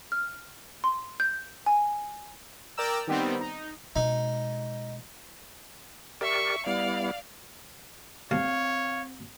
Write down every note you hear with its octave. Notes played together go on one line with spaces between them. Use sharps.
F6
C6
G6
G#5
A#4 D5 G5 A#5 E6
D#3 G3 B3 C4
D#4
B2 G#3 D#4
G4 A#4 D5 E5 C#6
G3 B3 E4 D5 F5
D2 C3 C4 C#5 F5 A5